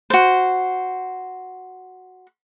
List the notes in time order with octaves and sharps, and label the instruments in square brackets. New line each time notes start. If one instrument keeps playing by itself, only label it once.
[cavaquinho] F#4 C5